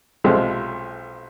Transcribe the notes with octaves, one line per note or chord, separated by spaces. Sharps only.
B1 C3 F3 G#3 A3